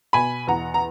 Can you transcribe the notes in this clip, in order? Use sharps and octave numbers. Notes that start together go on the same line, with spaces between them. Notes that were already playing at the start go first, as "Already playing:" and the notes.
B2 G#5 B5
E2 F#5 A#5
A#5